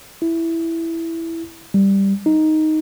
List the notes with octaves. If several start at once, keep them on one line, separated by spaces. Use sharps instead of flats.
E4
G3
D#4